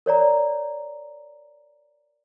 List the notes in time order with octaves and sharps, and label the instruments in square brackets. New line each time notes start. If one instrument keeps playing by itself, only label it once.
[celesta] A#4 C#5 D5 A#5